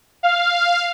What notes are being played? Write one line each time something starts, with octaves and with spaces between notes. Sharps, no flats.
F5